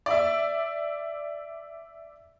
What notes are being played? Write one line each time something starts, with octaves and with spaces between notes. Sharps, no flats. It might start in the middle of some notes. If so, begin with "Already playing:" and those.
D5 E5